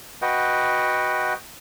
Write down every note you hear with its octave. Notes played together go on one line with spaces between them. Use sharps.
F#4 B4 D#5 F#5 G5